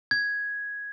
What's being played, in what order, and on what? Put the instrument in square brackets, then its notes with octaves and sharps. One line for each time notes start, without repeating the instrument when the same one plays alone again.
[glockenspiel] G#6